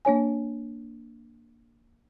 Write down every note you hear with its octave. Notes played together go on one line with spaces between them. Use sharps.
A#3 D4 C#5 G#5